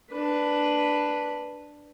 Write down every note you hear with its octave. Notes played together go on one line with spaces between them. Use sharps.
D4 B4